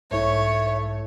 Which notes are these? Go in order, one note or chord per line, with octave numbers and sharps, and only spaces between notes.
B1 G#2 A3 E4 C#5